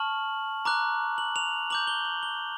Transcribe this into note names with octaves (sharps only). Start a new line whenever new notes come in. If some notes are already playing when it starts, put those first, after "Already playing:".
Already playing: A5 C#6 F6 F#7
A#5 D6 F#6
F#7
F7
A#5 D6 G6 F#7
G7
F#7
G7